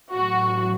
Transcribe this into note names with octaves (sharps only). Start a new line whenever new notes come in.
A1 A2 F#3 F#4